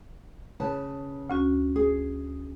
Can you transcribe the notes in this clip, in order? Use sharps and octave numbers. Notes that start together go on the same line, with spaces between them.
C#3 B4 A5
D2 C#4 F#4
G#4